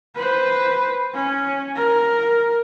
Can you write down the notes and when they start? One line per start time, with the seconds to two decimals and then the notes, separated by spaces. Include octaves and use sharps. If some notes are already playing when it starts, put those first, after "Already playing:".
0.15 B4 C5
1.14 C#4
1.76 A#4